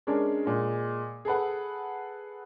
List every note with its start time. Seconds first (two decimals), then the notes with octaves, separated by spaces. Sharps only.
0.07 G#3 C#4 D4 G#4 A#4
0.45 A#2 G#3
1.25 G#4 A4 B4 F#5